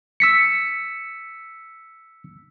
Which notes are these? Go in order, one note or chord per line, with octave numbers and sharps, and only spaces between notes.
E6 B6 C#7